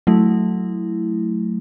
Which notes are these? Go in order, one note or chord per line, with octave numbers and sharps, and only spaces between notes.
F#3 A3 E4